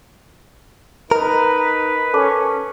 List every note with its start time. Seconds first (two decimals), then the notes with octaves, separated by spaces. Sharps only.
1.11 D#4 A#4 B4
2.14 C#4 A4 A5 D6